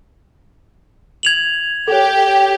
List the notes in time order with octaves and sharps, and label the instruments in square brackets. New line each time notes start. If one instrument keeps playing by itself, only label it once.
[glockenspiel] G#6 F7 F#7
[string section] G4 [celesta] A4 C#5